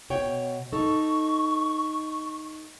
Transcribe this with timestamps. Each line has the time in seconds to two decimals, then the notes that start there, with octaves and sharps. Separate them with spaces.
0.10 B2 C#5 G5
0.73 D#4 A4 C#6